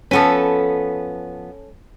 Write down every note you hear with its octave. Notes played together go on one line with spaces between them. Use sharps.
F3 B3 C#4 A4 B4